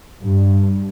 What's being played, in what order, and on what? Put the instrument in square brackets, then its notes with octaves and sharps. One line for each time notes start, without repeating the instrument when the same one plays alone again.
[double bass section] G2